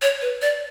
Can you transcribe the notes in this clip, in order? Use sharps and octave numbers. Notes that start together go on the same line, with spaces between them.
C#5
B4
D5